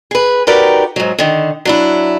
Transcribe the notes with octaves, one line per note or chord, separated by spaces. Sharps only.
G#4 B4
D#4 F#4 G4 A#4 B4 D5
G#2 F#3
D3 D#3
F#3 D4 E4